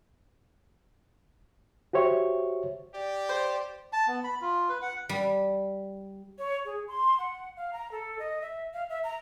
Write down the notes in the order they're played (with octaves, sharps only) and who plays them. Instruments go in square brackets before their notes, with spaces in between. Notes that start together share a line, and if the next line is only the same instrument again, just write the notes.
[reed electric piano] F#4 G4 C5 C#5 E5
[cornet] G4 [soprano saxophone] D5
[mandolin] C5
[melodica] A5
B3
B5
F4
B4
F#5
[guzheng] G3
[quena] C#5
G#4
C6
F#5
F5
A#5
A4
D#5
E5
F5
E5
A#5